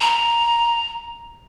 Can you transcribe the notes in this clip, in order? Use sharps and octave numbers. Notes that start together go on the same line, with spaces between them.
A#5